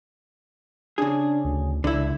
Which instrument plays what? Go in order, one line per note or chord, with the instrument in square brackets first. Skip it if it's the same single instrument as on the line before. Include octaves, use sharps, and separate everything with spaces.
[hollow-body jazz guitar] C#3 G#4 [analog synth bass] D4
[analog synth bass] D2
[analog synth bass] C#2 [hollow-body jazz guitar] D3 E4